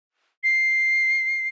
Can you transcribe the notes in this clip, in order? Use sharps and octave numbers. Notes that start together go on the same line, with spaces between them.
C7